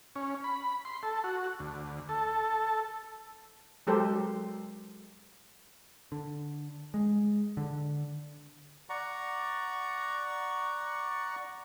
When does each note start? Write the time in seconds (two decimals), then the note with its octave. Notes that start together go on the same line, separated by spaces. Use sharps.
0.16 C#4
0.44 B5
0.85 C6
1.03 A4
1.24 F#4
1.60 D2
2.09 A4
3.87 F#3 G#3 G4 A4 A#4 C5
6.12 D3
6.94 G#3
7.57 D3
8.90 D5 F#5 A#5 C#6